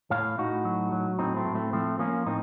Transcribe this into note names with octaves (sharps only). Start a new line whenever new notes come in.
A2 C#5 F5
A2 D#4 F#4
F#3
F#3
A2 C4 D#4
A3 C4
A2
A3 C4
F3 A3 C4
F3 A#3 C#4
A2 C4 D#4